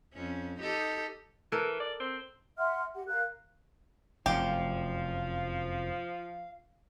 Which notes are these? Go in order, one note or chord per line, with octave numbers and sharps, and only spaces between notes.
F2 C#4
D#4 G4 A4
E3 A4 A#4
D5
C4
E5 F#5 C6 F6
G4 F#5
A#4 F5 F#6
F1 F#2 F3 G4 F5